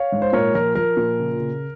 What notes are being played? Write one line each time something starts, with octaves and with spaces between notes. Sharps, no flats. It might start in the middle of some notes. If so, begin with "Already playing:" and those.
Already playing: C#5 F5
G#2
C5
A#2 A#4 C#5
F3 A#4
F3 A#4
A#2
C#3
C#3